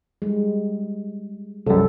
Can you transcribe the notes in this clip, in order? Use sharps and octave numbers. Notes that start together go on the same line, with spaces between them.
G3 G#3
C2 F#2 A4